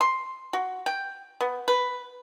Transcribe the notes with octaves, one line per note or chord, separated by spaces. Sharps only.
C6
F#4
G5
B3
B4